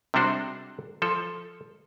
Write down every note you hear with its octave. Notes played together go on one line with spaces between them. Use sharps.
C3 G3 G#3 D4 F#4 C5
F3 A4